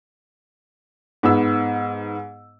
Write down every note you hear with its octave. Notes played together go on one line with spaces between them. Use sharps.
G#2 B3 E6